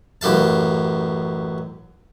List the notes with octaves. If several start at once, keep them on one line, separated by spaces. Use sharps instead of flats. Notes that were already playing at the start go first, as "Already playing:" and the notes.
A1 F#2 G4 F5 A5